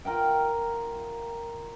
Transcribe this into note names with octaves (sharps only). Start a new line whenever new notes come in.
F4 A#4 F#5 G5